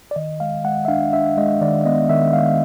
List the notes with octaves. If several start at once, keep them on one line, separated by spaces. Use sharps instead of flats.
D5
D#3 D#5
G#3 F5
G#3 F#5
E5
D4 F5
D4 E5
G#3 D#5
D#3 D5
B3 D#5
D#3 E5
G#3 F5